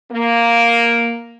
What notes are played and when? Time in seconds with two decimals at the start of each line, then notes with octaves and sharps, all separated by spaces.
0.12 A#3